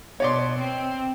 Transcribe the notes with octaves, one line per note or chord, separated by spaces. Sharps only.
B2 C#5 D5 C6
C4